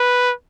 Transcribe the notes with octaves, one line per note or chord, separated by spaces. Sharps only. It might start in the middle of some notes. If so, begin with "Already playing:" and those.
Already playing: B4